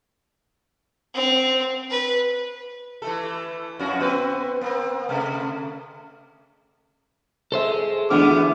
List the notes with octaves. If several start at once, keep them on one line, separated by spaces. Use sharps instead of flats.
C4
B4
E3 A3 A4
F2 C#4 F#4
B3 C4 B4
A#3 C4
C3 A3
G#3 A4 C5 E5
D2 E3 G#3 B3 D4 D6 F6